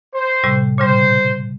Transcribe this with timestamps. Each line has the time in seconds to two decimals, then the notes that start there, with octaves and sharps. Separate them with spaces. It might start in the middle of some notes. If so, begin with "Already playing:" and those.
0.14 C5
0.44 A2 C3 G3
0.78 A#2 C#3 G3 C5